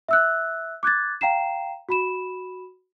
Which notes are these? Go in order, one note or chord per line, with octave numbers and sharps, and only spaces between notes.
E5 E6 F#6
D6 F#6 G#6 A6
F5 G5 A#5 C7 E7
F#4 B5 E7